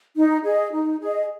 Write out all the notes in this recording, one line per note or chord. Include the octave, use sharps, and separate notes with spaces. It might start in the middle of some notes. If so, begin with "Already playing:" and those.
D#4
G#4 D#5
D#4
G#4 D#5